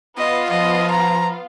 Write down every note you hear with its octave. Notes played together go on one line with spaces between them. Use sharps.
B3 F4 D#5 F5
F3 D#5
A#5